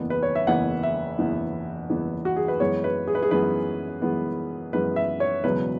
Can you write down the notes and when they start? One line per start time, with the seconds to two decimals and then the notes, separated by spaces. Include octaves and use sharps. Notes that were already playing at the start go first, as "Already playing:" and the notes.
Already playing: F#1 E2 E3 B3
0.10 B4
0.23 C#5
0.35 E5
0.47 F#1 E2 E3 B3 F#5
0.83 E5
1.18 F#1 E2 E3 B3
1.89 F#1 E2 E3 B3
2.25 F#4
2.36 G#4
2.48 B4
2.60 F#2 E3 G#3 B3 C#5
2.84 B4
3.07 G#4
3.15 B4
3.23 G#4
3.31 F#2 E3 G#3 B3 B4
4.02 F#2 E3 G#3 B3
4.73 F#2 E3 G#3 B3 B4
4.96 E5
5.20 C#5
5.44 E1 E2 C#3 F#3 B4